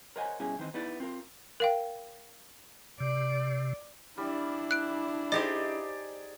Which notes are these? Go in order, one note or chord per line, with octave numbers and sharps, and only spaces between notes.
A#4 C5 C#5 D#5 F#5 G#5
G2 B2 C#4 E4 G#4
D#3 E3 C4 D#4
B3 D#4 E4 D5
C4 F4 A#4
A#4 F5 G5
C3 D5
G3 D4 E4
F#6 D7
D#4 G4 G#4 C5 D5 D#5